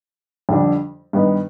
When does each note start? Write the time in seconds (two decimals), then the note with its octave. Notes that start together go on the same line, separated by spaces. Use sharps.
0.49 F2 D3 G3 D4
1.13 G2 D#3 B3 D#4 B4